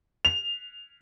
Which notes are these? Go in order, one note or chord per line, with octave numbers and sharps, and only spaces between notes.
F7